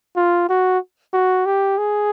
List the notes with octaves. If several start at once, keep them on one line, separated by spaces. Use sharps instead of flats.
F4
F#4
F#4
G4
G#4